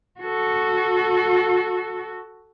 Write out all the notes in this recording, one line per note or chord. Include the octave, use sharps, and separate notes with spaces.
F#4 A4